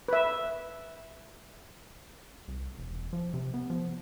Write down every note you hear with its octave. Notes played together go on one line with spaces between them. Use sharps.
B4 E5
C2
E1
F3
C3
B3
F3